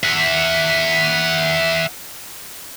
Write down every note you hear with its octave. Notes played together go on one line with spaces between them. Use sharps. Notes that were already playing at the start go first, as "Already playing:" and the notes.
E5 F#5